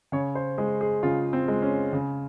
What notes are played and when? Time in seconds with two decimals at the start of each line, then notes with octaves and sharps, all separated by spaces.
0.12 C#3 C#5
0.35 C5
0.58 G#3 G#4
0.81 G#4
1.03 C#3 F4
1.33 C4
1.48 G#3
1.62 C#4
1.93 C#3